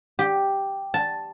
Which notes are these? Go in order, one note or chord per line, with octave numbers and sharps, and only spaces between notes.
G4
A5